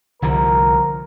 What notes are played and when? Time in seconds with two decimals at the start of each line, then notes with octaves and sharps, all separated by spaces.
0.22 C2 D3 F3 A#4